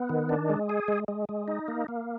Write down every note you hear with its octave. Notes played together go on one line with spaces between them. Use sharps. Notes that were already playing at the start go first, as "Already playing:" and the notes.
Already playing: B3
D#3
D4
G#3
G#4
G#3
G#3
G#3
D#4
A#3
A#3